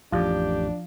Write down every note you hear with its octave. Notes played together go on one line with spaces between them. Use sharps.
A1 F2 F3 D4 G4